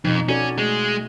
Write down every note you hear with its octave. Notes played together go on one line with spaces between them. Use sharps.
F2 B2 D#4
C#4 F#4 A4 D5
G#3 A3